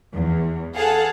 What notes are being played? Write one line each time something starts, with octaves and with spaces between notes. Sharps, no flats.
E2
G#4 A4 F5 F#5 A5